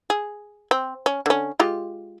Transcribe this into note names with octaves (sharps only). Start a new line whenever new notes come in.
G#4
C4
C#4
D3 C#4
G#3 F4 G4